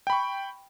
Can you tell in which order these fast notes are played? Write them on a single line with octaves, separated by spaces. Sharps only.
G5 B5 C#6